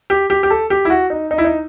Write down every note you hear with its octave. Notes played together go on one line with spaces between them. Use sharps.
G4
G4
G4
A4
G4
E4
F#4
D#4
D#4
E4
D#4